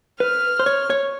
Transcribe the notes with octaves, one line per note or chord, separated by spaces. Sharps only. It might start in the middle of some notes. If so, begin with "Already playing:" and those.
B4 F6
C5
C#5
C#5